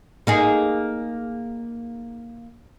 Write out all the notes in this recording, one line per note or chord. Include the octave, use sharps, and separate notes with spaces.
A#3 D#4 G#4